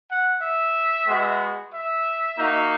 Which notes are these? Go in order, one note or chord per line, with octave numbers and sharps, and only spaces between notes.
F#5
E5
G#3 B3 F#4
E5
A#3 D#4 F#4